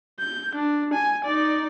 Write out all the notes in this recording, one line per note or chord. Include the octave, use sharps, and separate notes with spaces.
G6
D4
G#5
D#4 D5